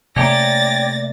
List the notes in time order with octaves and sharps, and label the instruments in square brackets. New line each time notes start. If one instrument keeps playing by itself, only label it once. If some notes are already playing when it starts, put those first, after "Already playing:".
[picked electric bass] C3 A3 A#3 [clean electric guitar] C#4 G4 [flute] D5 [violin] A6 A#6